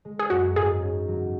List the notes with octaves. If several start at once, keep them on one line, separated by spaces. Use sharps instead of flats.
G#3
G#4
F#2 F#4
G#2 G#4
C#4
F#3